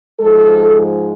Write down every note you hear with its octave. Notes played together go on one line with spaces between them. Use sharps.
G#2 F3 G#3 A4